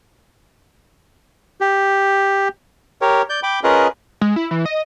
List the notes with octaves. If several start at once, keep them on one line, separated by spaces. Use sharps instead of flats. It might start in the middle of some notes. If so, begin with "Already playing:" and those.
G4
G4 A#4 C#5
D5 G6
G5 B5 D6
C#4 F4 G#4 A#4 B4 D#5
G#3
E4
E3
D#5